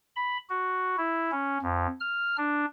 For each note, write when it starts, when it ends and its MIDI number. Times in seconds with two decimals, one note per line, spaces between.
0.16 0.38 83
0.49 0.96 66
0.98 1.31 64
1.32 1.58 61
1.62 1.87 41
2.00 2.36 89
2.38 2.65 62